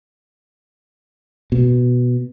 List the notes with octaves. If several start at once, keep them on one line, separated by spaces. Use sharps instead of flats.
B2